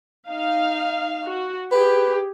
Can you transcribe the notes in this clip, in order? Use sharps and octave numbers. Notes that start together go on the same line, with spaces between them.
D#4 F5
F#4
G4 G#4 B4